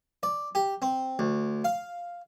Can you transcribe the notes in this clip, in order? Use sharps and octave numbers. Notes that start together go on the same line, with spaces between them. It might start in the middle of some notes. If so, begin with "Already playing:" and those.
D5
G4
C4
D2
F5